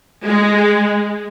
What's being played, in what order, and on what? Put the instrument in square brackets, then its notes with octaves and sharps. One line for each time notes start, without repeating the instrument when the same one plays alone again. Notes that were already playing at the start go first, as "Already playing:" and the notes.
[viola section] G#3